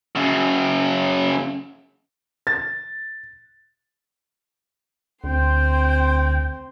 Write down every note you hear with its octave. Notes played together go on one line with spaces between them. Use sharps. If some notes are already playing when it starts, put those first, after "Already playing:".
F#2 C#3
A6
D2 C4 G5 C6